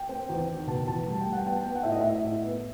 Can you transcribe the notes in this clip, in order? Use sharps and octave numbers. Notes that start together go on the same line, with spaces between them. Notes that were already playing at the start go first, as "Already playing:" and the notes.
Already playing: G5
C4
E2
D#3
B2 A5
E2 A5
G3 A5
G5
G3
F#5
B3 G5
A5
B3 G5
F#5
A2 E5
D#5
A2 E5
A2
B3